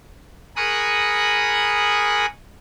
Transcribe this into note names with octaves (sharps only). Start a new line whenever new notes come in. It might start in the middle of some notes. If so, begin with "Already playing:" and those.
G#4 A#4 B5 C#6 D#6 F#6